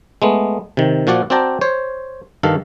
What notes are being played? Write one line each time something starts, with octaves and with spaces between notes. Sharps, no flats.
G#3 A3 B3
C3 D#3
A#2 F3 F#4 D5 F#5
C4 F#4 D5 G5 A5 A#5
C5 C#5
G2 D#3 A4 F5